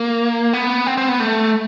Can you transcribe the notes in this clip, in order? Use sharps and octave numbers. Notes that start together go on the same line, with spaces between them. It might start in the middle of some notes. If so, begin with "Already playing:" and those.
Already playing: A#3
B3
C4
C4
B3
A3